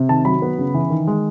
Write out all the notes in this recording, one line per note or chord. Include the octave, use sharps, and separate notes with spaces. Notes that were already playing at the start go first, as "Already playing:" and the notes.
Already playing: C3
D#3 A5
F#3 B5
B3
C#3
E3
D#3
G#3